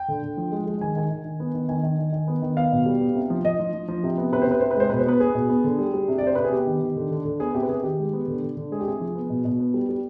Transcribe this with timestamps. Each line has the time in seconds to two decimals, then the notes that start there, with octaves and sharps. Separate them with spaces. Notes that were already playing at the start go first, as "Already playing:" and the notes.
Already playing: G5
0.08 D3
0.23 D3
0.37 F3
0.52 G#3
0.66 G#3
0.81 D#3 G#5
0.96 D#3 G#5
1.11 D#3
1.25 D#3
1.40 B3
1.54 D#3
1.69 D#3 G#5
1.83 D#3
1.99 D#3
2.12 D#3
2.28 B3
2.42 D#3
2.57 B3 F5
2.72 B2
2.86 G3
3.01 B3
3.15 C3
3.30 F3
3.45 F3 D#5
3.59 F3
3.73 F3
3.88 F3
4.03 C3
4.18 B3
4.32 C3 B4
4.42 C5
4.47 C3 B4
4.61 C3 C5
4.71 B4
4.76 G#3 C5
4.89 B2 B4
4.99 C5
5.06 B3 B4
5.20 B3 G#4
5.35 B2
5.49 B3
5.64 D3
5.79 G3
5.94 G3
6.08 C3
6.18 D5
6.23 C3 C5
6.35 C3 B4
6.44 G#4
6.52 B3 G4
6.67 D#3
6.81 D#3
6.96 D3
7.11 D3
7.25 D3
7.40 B3 G#4
7.54 C3 G4
7.63 B4
7.69 C3 G#4
7.80 G#4
7.83 D#3 G4
7.99 G#3
8.13 B3
8.28 D3
8.42 D3
8.57 D3
8.71 G#3 G#4
8.80 G4
8.86 C3 G#4
9.00 F3
9.15 B3
9.30 B2
9.45 B2
9.60 B3
9.74 G3
9.89 G3